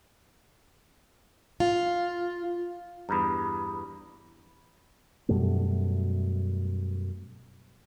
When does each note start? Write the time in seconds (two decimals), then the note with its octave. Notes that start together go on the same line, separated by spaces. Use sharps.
1.60 F4
3.09 E2 G2 A#5 B5 D#6
5.29 F#2 B2 G3 A3